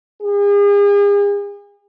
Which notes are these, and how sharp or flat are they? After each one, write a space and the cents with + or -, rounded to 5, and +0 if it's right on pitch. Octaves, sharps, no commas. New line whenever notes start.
G#4 -40